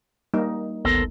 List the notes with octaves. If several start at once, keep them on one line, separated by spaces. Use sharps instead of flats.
G3 A#3 D#4
G#1 D2 B3 A4 A#4 C5